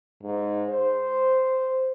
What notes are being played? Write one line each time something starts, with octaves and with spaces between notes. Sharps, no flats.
G#2
C5